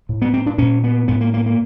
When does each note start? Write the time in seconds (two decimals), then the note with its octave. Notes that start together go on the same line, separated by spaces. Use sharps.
0.09 A2
0.22 B3
0.34 C4
0.46 D4
0.58 A#2 C#4
0.84 B3
1.08 A2 B3
1.21 A#3
1.34 A#3
1.46 A#3